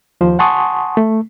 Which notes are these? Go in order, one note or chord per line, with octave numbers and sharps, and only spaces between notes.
D#2 F3 C5
F#5 G#5 A5 C6 C#6 D#6
A3